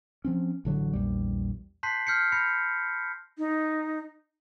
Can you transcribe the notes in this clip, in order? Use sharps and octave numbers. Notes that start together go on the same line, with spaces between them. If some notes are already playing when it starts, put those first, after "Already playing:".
F3 C4 C#4
A1 D3 F#3
A#1 E2 G3
A5 C6 F#6 G6 B6 C7
F6 G6 C7 C#7
B5 G6 A#6 C7 C#7
D#4